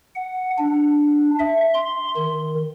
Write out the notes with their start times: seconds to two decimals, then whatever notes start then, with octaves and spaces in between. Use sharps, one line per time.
0.15 F#5
0.58 D4
1.39 E5
1.74 C6
2.16 D#3